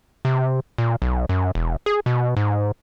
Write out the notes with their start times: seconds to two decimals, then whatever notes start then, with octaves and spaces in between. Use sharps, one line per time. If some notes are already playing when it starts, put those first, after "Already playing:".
0.25 C3
0.78 A#2
1.02 B1
1.29 F#2
1.55 E1
1.86 G#4
2.06 B2
2.37 G#2